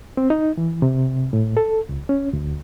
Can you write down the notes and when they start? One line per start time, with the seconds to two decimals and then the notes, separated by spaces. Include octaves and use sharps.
0.17 C4
0.30 D#4
0.57 E3
0.82 C3
1.33 A2
1.57 A4
1.89 C#2
2.09 C#4
2.33 D2